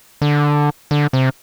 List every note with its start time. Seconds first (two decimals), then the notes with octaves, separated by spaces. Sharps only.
0.22 D3
0.91 D3
1.13 C3